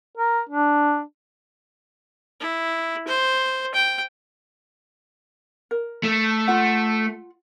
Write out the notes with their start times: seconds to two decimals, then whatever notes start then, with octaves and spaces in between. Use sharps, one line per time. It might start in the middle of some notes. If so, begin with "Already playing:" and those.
0.18 A#4
0.49 D4
2.40 E4
3.07 C5
3.74 G5
5.71 A#4
6.03 A3
6.48 F4 F#5